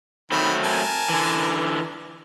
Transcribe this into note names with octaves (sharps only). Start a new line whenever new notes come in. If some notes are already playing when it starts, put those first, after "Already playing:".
D#3 F#3 A3 C4 B5
A#4 G#5 A5
D3 E3